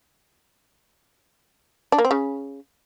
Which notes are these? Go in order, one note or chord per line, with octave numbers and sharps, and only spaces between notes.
D4
A#3
C4
C#3